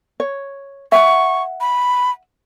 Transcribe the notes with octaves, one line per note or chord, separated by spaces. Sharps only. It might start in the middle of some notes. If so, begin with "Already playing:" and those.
C#5
E5 F#5 C#6
B5